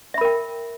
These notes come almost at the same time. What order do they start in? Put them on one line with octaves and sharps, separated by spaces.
E5 B5 A#4 G5